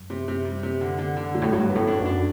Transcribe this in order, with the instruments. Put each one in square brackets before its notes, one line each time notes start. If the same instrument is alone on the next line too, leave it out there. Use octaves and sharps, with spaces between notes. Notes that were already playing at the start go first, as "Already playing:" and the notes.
Already playing: [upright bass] F#2
[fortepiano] C3
C3
G3
C3
D3
D3
D3
F#3
[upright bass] A2
[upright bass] G2 [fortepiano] F#3
[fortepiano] B3
[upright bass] A2
[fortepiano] D4
[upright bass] F#2
[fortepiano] D4